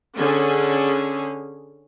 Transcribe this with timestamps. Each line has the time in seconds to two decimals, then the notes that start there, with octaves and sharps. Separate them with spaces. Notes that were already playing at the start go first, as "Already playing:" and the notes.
0.17 D3 C#4 G#4